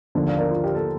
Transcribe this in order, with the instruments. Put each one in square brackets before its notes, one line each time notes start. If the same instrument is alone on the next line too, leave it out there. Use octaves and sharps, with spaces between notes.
[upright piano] D#2 D3 F3
D5 F5
A#4 D5
F4
G4
A4